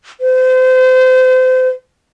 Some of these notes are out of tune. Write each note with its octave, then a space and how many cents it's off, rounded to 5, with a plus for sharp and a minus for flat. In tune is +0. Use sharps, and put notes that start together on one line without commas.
C5 -30